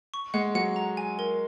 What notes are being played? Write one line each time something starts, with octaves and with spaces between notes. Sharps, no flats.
C#6
G#3 F#5
F#3 F#5
A#5
G#5
A#4